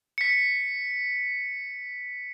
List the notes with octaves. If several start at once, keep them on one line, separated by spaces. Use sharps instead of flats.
B6 C#7